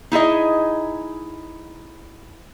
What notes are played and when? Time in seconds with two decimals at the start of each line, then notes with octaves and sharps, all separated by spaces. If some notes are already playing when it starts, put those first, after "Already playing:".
0.12 D#4 E4 G#4 D#5